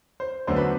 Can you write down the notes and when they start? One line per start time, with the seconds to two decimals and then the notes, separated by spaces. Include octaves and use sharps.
0.20 C5
0.47 D2 D3 F#3 B3 D4 C5
0.56 B4